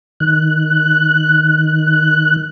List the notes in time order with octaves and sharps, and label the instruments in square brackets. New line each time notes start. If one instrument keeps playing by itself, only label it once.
[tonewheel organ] D#3 F#6